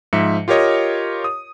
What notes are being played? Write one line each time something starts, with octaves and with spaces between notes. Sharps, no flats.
G#2 F3 E5 C#7
F4 G4 A#4 C#5 D#5
D#6